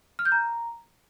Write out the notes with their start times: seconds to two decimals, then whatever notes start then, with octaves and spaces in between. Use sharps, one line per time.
0.19 F6
0.25 G6
0.32 A#5